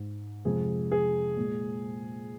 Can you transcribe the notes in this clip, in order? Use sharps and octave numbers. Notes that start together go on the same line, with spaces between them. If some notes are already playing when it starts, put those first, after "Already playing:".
Already playing: G#2 G#3
F2 C3 G#3 G#4
G#4
A#2 G#3